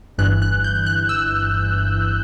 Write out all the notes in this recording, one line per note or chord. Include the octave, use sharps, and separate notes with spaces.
G1 G2 E3 F#6
F#6
G6
F#6
E6